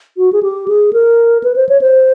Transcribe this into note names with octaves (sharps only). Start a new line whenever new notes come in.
F#4
G#4
G4
G#4
A#4
B4
C5
C#5
C5